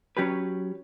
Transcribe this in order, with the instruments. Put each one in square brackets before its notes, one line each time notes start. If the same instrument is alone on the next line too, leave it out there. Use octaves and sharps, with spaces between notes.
[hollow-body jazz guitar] F#3 C#4 G4 B4